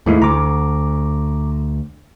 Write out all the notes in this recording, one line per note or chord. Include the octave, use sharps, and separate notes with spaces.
D#2 G#2 A3 E4
D2 A#5 D6